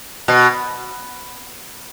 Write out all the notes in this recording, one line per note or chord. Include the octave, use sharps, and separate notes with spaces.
B2